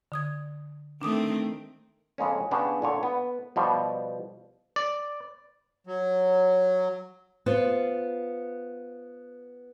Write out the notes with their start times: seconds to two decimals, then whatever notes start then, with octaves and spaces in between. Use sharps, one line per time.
0.12 D3 D#6 G#6
1.02 D#3 A3 C4 D4 D6 D#6
2.18 F2 C#3 G#3 A#3 C#4
2.51 C#3 B3 C#4 D4 G4
2.82 A#2 D3 C#5
3.03 B3
3.56 B2 F3 G3
4.76 D5
5.87 F#3
7.46 B3 F4 B4 C5